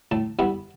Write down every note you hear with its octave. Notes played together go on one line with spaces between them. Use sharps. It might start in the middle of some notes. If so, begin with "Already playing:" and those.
A2 A5
G3 B3 E4